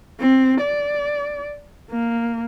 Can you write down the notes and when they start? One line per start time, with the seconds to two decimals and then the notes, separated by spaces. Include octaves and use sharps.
0.20 C4
0.60 D5
1.91 A#3